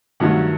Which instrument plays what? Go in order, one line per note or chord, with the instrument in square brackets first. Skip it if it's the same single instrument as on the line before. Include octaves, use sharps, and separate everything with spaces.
[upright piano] G2 D#3 F#3 A3 F#5